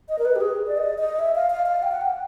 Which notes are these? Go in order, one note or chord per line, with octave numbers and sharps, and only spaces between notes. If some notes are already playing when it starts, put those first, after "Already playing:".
D#5
A#4
B4
G4
G#4
D5
D#5
D#5
E5
F5
F5
F5
G5
F#5
G5